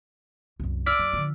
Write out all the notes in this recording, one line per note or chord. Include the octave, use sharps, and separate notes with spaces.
C2 F#2
D5 E6 F6 B6
F#2
D3 F3